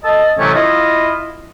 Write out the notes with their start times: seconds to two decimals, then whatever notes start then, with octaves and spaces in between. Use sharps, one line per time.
0.04 A4 D#5 A5
0.39 A2 C3 E3 F#3 A3 C#4
0.54 E4 F4 D#5